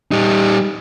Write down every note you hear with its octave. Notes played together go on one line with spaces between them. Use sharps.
G3 D#4